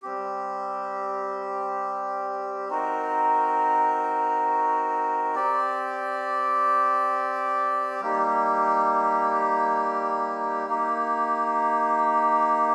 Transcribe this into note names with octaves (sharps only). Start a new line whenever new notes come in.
G3 C4 G4
C4 D#4 F#4 A#4
C4 G4 D5
G3 A#3 D#4 G4
A#3 D#4 G4